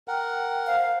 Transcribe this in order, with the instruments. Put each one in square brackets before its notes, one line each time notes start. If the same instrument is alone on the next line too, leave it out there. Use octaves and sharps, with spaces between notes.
[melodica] A#4 F#5 [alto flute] G5
[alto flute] C5 [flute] F5